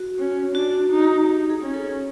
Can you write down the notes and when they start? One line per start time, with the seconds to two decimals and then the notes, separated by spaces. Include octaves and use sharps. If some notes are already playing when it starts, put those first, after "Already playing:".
Already playing: F#4
0.19 C#4
0.55 D4 F#4
0.90 D#4
1.26 D#4 G4
1.50 G#4
1.62 C#4
1.74 A4